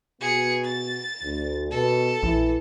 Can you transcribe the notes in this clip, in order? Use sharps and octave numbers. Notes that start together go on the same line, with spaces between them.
B2 B3 F#4 G#4 C#7
A6
D2
B2 A4
A#1 E3